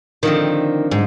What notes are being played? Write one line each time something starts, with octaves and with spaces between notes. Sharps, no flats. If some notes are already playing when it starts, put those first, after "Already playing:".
D3 D#3 F3 C4
G#2